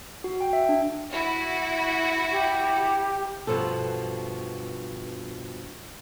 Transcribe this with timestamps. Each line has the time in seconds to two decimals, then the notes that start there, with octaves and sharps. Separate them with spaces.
0.24 F#4
0.41 G5
0.53 E5
0.69 D4
1.11 E4 F#4
2.31 G4
3.47 G2 B2 F3 B3 A4